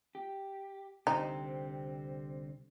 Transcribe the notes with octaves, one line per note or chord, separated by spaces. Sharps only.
G4
C2 D3 C4 D#4 G4 C5